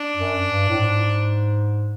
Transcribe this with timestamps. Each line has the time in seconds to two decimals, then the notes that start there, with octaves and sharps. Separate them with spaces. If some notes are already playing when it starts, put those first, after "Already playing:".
Already playing: D4
0.16 F#2
0.47 G2
0.68 A2
0.78 G#2